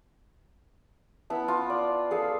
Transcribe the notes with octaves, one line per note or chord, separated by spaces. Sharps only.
B3 E4 A5
F4
D5
G#4 A4 F5